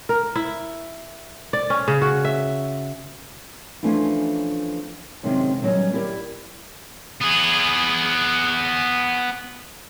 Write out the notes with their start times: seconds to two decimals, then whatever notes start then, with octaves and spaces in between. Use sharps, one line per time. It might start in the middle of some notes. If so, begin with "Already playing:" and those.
0.09 A#4
0.36 E4
1.53 D5
1.70 C#4
1.88 C#3
2.02 F#4
2.25 E5
3.83 E3 F3 A3 C#4 D4 E4
5.23 F#2 C3 D#3 G#3 C#4
5.62 D3 D#3 F#3 G3 B3 C#4
5.93 E4 G4 A#4 D5
7.22 B3 G#4